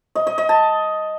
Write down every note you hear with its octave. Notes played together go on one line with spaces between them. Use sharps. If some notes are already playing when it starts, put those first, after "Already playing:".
D#5
D#5
D#5
A5